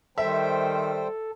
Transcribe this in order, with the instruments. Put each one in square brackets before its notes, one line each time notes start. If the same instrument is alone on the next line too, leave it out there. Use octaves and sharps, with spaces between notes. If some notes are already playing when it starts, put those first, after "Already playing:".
[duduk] D#3 [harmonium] G3 C5 G5 [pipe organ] A4 [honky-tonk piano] E5